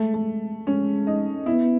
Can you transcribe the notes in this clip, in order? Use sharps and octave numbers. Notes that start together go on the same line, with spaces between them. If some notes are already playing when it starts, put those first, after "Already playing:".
Already playing: G#3 A3
A3
G#3 C#4
D#4
B3 E4